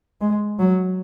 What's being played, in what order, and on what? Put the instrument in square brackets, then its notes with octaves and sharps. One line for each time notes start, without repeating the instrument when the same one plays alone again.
[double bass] G#3
F#3